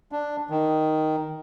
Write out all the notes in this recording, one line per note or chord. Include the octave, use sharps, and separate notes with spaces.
D4
D#3